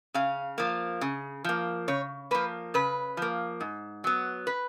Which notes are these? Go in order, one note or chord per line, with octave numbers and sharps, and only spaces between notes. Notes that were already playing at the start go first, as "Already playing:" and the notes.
C#3 F5
F3 A#3
C#3
F3 A#3
C#3 C#5
F3 A#3 B4
C#3 B4
F3 A#3
G#2
F#3 B3
B4